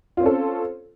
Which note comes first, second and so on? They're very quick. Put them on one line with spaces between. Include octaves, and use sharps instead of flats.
F4 C4 C#4 A4